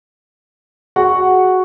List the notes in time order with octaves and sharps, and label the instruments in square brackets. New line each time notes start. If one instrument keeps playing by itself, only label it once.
[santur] F#4 [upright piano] G#4 F#5